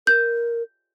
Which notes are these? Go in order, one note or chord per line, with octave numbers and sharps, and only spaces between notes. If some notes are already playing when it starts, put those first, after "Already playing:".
A#4 G6